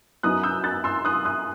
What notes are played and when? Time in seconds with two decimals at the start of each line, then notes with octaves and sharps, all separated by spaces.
0.23 F#2 F#3 B3 D#4 D#6 F#6
0.43 E6 G6
0.64 F#6 A6
0.84 C6 E6
1.05 D#6 F#6
1.25 D#6 F#6